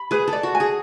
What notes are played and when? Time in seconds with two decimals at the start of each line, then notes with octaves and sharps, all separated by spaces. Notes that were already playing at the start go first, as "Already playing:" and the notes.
Already playing: B5
0.11 G#4 B4
0.28 A4
0.33 D5
0.43 F#4
0.55 G#5
0.60 G#4